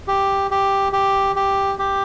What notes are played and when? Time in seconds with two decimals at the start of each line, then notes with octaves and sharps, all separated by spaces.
0.08 G4
0.51 G4
0.93 G4
1.36 G4
1.79 G4